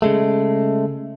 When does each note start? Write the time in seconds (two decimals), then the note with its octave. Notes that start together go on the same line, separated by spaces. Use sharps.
0.02 C#3 G#3 A3